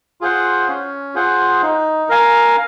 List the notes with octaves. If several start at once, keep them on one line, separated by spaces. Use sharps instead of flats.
F4 G#4 C5 F#5
C#4
F4 G#4 C5 F#5
D#4
A#4 F5 G#5